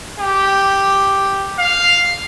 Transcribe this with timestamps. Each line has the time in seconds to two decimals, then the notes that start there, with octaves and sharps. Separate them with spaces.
0.19 G4
1.59 F5